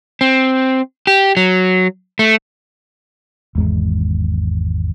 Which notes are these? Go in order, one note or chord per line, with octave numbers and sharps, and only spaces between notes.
C4
G4
F#3
A3
G#1 E2 G#3